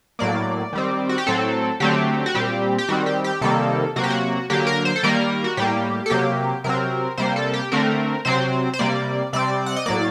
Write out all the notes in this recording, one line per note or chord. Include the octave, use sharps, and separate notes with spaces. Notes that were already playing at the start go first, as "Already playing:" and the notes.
A2 F#3 A#3 D5
D#3 G3 C4
F#4
G4
A2 F#3 C4 A4
D3 F#3 A3 C4 G4
F#4
A#2 G3 C4 G4
G4
D#3 G3 C4 F#4
G4
G4
C3 D#3 G3 A#3 A4
C3 F#3 A#3 F#4
G4
F#4
D3 F#3 A#3 G4
A#4
C5
A4
D#3 G3 A#3 A#4
F#4
A2 G3 A#3 G4
A4
C3 F#3 A#3 G4
C3 F#3 C4 A#4
C3 G3 A#3 C5
A4
G4
D3 A3 C4 A#4
C3 F#3 C4 C5
C5
C3 G3 A#3 D5
C3 G3 C4 D5
F#5
D#5
A2 F#3 A#3 D5